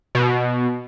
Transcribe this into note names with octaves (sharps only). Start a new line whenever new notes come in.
B2